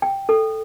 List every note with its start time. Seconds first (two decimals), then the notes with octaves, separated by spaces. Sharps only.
0.02 G5
0.29 A4